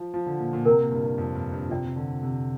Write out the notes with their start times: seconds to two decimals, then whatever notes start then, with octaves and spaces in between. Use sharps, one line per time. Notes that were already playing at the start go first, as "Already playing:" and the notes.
Already playing: F3
0.14 F3
0.27 D3
0.40 A#2
0.53 A#2
0.65 C3 A#4 G5 A#5
0.79 A#2
0.91 G2
1.05 G2
1.18 F2
1.35 G2
1.52 G2
1.70 C3 F4 D5 G5
1.85 C3
1.96 D3
2.23 C3